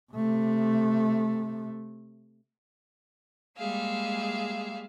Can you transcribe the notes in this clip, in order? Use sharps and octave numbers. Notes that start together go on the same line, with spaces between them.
C3 A3
G3 G#3 A#3 G#4 E5 F5